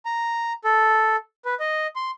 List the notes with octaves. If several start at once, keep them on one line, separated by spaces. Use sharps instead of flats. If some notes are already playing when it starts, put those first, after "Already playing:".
A#5
A4
B4
D#5
C6